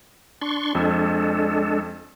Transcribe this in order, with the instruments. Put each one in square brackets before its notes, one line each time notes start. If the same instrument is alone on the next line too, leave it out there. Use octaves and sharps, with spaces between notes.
[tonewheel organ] D4 C6 C#6
[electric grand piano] F2 [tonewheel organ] G#3 D4 A4